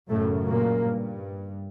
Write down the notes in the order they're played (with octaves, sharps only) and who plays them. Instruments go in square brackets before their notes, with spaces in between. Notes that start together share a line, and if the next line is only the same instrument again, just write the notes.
[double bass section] F#2 A2 C#3 A3
A#2 A#3
G2